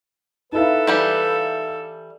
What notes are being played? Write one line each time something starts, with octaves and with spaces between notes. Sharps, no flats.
D#4 E4 A4 B4 F5
E3 G3 G4